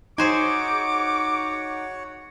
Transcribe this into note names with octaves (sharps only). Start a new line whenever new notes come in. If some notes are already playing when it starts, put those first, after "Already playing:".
D#4 F#4 G#4 C5 C#5 F#5 G#5 D6